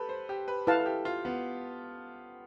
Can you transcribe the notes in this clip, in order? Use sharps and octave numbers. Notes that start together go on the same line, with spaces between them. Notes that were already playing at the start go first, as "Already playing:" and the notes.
Already playing: G4 A4 B4
C5
G4
B4
E4 A4 B4 F5 A5
A4
G4
F4
B3